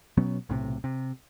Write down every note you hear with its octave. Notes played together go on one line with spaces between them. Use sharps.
B2 F#3 B3 C#4
B1 A2 C3
C3